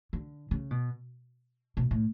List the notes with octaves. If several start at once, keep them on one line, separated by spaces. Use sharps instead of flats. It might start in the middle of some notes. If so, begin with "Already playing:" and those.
D3
C#3
B2
B2
A2